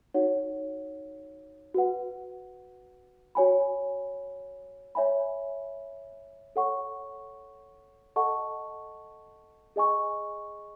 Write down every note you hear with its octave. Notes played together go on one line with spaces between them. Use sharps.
D#4 F#4 C#5 F#5
F#4 B4 F#5
F#4 C#5 G#5 B5
C#5 E5 G#5 B5
A4 C#5 F#5 C#6
A4 D#5 F#5 A5 C#6
G#4 D#5 G#5 C#6